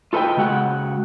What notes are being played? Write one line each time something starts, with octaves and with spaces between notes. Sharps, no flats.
F4 A4 B4 D#5 G5
C#3 G#3 F#4 F#5 G5